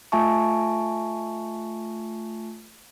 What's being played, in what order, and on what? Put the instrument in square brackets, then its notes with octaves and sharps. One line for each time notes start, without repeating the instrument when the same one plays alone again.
[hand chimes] A3 F4 E5 G#5 A5 C#6